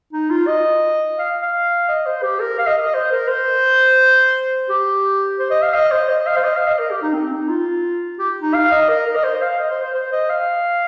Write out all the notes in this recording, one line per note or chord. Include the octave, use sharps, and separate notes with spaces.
D#4
F4
D#5
F5
F5
D#5
C5
G4
A#4
F5
D#5
D#5
C5
A#4
C5
G4
C5
D#5
F5
D#5
C5
D#5
F5
C5
D#5
F5
D#5
A#4
G4
D#4
C4
D#4
F4
G4
D#4
F5
D#5
A#4
A#4
D#5
C5
F5
D#5
C5
C5
C5
D#5
F5